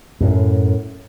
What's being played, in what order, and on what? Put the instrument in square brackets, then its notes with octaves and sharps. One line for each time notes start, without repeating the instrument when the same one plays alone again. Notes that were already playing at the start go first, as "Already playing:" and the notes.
[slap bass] F#2 A2